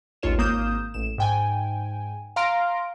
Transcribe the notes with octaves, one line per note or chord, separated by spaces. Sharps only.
A1 D#2 F4 C#5 E7
G#1 A#3 D#6 G6 E7
A1 E7
G#2 G5 G#5
F5 A#5 C6 F6 A#6 D7